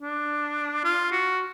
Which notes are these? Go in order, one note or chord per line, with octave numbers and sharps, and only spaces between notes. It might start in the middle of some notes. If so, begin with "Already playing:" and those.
D4
F4
F#4